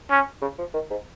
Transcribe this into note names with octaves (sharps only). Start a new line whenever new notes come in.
C#4
C#3
F3
D#3
G#2